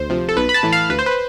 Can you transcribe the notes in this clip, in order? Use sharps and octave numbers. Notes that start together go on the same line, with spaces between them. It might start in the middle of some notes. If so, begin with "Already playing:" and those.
Already playing: D2 C5
C3 F3
A4
B1 B4
B5
A5
A2 E3
F5
D2 B4
C5
B4